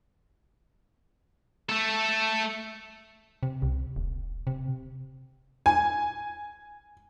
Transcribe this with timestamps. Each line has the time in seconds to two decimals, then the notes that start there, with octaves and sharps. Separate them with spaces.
1.69 A3 A4
3.43 C3
3.62 C2
3.96 D#1
4.47 C3
5.66 G#5